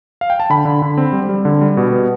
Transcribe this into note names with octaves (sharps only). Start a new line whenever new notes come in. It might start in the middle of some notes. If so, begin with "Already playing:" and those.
F5
G5
A5
D3 B5
D3
D3
C4
G3
G3
D3
G3
B2
B3